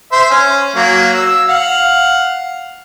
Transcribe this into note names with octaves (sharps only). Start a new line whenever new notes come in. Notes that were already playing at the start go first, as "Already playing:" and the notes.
C5 E5
C#4
F#3 A#3 C#5
E6
F5 F#5